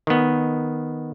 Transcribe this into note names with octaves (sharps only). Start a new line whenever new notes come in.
D#3 B3